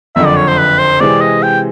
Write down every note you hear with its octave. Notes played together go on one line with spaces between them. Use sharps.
F#1 F2 D3 E5
D5
C#5
C5
B4
C5
C3 E3 G#3 C4 D5
D#5
G5